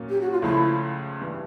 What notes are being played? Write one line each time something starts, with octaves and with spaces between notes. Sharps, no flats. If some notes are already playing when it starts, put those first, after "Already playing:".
Already playing: A#2 F#3 A#3 C#4
G4
F#4
F4
C#2 C#3 F3 A3 E4
G2 E3 G3